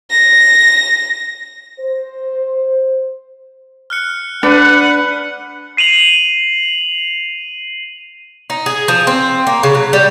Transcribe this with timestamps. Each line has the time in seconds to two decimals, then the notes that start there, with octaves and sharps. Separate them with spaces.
0.11 A#6
1.80 C5
3.90 F6 F#6 C#7
4.43 D4 B4 F#5
5.77 C7 D#7 F7 F#7
8.50 D#4
8.66 G#4
8.88 F3
9.07 C4
9.47 A#3
9.63 C#3
9.75 F#3
9.93 G3